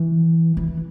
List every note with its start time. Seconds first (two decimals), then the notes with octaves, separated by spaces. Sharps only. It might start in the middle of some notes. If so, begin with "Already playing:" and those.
Already playing: E3
0.57 E3